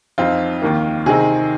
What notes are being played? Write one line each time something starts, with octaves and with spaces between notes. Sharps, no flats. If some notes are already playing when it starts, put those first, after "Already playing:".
F2 F3 C4 D#4 F4
D#2 D#3 A#3
C3 D#3 C4 D#4 G#4